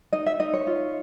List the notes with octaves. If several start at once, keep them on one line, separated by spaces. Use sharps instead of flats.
D#4 D#5
E5
D#4 D#5
C#5
F4